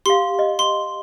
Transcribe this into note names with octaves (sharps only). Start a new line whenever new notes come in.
G4 F5 C6
D#5
C6